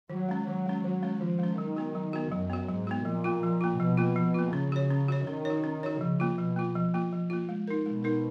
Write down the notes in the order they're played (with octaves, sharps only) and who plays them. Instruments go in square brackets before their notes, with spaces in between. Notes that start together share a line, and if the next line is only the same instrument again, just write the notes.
[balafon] D#3 [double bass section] F#3
[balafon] G#3 C#4
[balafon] D#3 [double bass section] F#3
[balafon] G#3 C#4
[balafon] D#3 [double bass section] F#3
[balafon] G#3 C#4
[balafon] D#3 [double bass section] F3
[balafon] G#3 C#4
[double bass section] D#3 [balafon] F#3
[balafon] B3 F#4
F#3
B3 F#4
[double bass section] F#2 [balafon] F#3
[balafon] B3 F#4
[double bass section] G#2 [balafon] F#3
[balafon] B3 F#4
[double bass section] A#2 [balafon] F3
[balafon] A#3 F4
F3
A#3 F4
[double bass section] B2 [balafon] F3
[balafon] A#3 F4
F3
A#3 F4
[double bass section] C#3 [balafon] C#4
[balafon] F#4 C#5
C#4
F#4 C#5
[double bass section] D#3 [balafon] C#4
[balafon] F#4 C#5
C#4
F#4 C#5
[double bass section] C#3 [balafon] F3
[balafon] A#3 F4
[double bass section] B2 [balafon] F3
[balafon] A#3 F4
F3
A#3 F4
F3
A#3 F4
G#3
D#4 A#4
[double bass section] B2 [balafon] G#3
[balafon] D#4 A#4